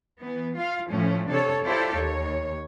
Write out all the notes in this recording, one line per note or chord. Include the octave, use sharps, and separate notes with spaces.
E3 B3
F4 F5
A2 F3 A3 C#4
C3 D4 A4 C#5
E4 F4 G4 A4 C5 D5
D#2 C#5